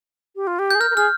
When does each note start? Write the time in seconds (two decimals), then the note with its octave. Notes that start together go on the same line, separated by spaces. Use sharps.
0.36 G4
0.47 F4
0.59 G4
0.71 G#4 G6
0.80 A#4 F6
0.91 A#4
0.96 G#4 F6